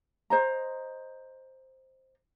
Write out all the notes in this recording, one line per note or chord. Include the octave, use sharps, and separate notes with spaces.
C5 D#5 A#5